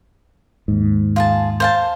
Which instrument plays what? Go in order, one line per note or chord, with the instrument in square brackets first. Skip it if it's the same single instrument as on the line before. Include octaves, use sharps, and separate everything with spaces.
[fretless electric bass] D#2 G#2
[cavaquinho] F4 G#4 A5
C5 F5 A5